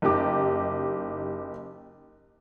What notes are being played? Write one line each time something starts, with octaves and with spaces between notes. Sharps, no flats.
F#1 D#4 G4 D6